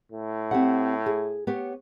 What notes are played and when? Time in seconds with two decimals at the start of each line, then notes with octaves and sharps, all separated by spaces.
0.12 A2
0.51 C4 G4 F#5
1.06 G#4
1.47 B3 G4 C#5